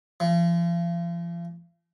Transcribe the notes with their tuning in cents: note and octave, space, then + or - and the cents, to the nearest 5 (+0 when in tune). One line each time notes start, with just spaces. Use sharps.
F3 -40